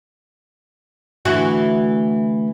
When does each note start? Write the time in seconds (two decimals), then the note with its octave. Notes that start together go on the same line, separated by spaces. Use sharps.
1.25 D2 E3 F#4